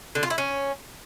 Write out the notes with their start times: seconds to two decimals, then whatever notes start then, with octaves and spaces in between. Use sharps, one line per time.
0.15 D3
0.23 F4
0.30 E4
0.38 C#4